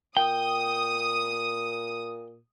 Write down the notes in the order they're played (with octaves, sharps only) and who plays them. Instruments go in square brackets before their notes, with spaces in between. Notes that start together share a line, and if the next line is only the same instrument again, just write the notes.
[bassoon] A#2 [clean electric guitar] G5 [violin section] D#6